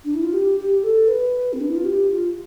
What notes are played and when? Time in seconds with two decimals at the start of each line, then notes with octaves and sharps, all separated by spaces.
0.05 D4
0.14 E4
0.23 F4
0.33 G4
0.58 G4
0.83 A4
1.08 B4
1.53 C4
1.61 D4
1.69 E4
1.76 F4
1.85 G4
2.10 F4